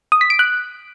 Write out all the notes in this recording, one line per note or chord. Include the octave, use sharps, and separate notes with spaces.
D#6
B6
D7
F#6